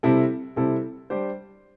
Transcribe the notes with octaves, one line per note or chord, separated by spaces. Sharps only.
C3 G3 C4 E4 A4
C3 G3 C4 E4 A4
G3 D4 G4 C5